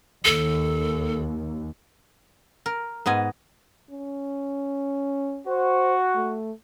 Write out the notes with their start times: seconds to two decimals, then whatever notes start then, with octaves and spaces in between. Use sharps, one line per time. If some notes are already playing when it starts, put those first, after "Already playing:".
0.25 D#2 A4
2.66 A#4
3.06 G#2 B3 D#5 G#5
3.90 C#4
5.47 F#4 C5
6.15 A3